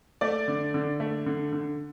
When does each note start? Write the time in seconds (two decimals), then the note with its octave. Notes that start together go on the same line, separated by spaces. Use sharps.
0.21 A3 D5
0.48 D3
0.74 D3
1.00 A3
1.26 D3
1.52 D3